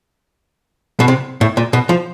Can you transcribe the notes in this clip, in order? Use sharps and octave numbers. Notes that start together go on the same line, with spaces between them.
B2
C3
A2
A#2
B2
F3